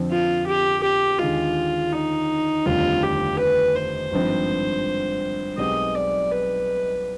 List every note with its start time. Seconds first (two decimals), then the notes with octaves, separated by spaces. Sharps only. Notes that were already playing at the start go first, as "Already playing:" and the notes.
Already playing: F2 D3 F3 C4
0.10 F4
0.46 G4
0.83 G4
1.19 D#2 D3 G#3 F4
1.92 D#4
2.65 F1 D#2 D3 G3 C4 F4
3.03 G4
3.39 B4
3.75 C5
4.12 G#1 G2 F3 C4
5.58 B1 B2 G#3 C4 G4 D#5
5.95 D5
6.32 B4